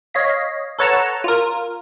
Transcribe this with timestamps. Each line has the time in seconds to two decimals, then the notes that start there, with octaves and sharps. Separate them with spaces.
0.14 C#5 D#5 F5 B6
0.79 A4 B4 C#5 F#5 A5 A#5
1.24 F4 A#4